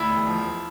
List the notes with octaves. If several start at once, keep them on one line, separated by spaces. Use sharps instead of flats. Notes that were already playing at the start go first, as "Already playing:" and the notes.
Already playing: D2 E4
E1
F3
F3